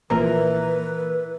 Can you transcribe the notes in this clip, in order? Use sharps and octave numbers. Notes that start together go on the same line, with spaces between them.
A#1 A#2 E3 A#4 B4